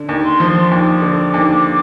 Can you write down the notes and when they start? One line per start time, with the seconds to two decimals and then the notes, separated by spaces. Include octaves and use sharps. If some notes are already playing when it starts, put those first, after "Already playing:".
Already playing: D3
0.09 D#2
0.24 C6
0.40 F3
0.71 D#2 D6
1.02 D3
1.34 D#2